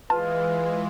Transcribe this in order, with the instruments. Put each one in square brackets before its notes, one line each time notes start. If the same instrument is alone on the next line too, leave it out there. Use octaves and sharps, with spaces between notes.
[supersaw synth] E3 G#3 [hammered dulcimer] F4 [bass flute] B4 [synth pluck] A5